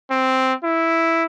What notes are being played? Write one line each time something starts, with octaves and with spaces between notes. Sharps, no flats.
C4
E4